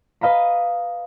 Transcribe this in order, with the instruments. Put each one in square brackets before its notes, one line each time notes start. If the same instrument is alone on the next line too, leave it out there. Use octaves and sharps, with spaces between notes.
[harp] B4 D#5 F5 A#5 B5